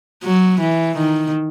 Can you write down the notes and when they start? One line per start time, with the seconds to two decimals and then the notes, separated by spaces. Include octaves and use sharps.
0.24 F#3
0.60 E3
0.97 D#3